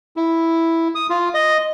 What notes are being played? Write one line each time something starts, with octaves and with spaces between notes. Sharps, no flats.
E4
D#6
F4
D#5